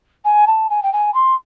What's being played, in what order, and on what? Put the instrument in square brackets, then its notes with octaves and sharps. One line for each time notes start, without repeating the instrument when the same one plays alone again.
[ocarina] G#5
A5
G#5
G5
G#5
C6